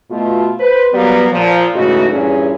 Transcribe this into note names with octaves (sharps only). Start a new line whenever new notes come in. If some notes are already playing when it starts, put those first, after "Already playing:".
B2 A3 F4
B4 C5
F#3 G3 A#3 B3
A#2 F3
G#2 C#3 E3 A3 D#4 F#4
G2 A#2 E3 C#4 G#4